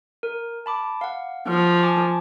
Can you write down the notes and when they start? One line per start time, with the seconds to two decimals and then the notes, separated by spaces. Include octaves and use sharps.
0.23 A#4
0.66 A5 B5 D6
1.01 F5 F#5
1.48 F3
1.83 G#5 A5 D6